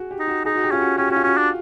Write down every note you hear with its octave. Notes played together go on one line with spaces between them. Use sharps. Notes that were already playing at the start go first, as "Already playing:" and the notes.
Already playing: F#4 G#4
G4
D#4
F#4
D#4 G#4
F#4
G4
C#4 F4
F#4
C#4 G4
C#4 F#4
F4
C#4 F#4
D4